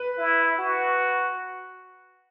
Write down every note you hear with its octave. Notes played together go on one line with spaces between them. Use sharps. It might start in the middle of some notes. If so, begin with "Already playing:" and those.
Already playing: B4
E4
F#4